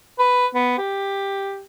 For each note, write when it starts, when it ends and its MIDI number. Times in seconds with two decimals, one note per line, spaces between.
0.19 0.47 71
0.55 0.77 59
0.78 1.62 67